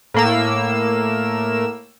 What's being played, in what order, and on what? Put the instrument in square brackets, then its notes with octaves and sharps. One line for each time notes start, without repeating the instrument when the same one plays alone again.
[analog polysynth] A2 A#3 E6